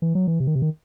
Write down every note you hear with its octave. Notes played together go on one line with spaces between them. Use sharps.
E3
F#3
E3
C3
D#3
C3
D#3